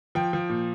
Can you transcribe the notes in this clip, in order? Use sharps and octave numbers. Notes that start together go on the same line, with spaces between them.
F3 G5
F3
A#2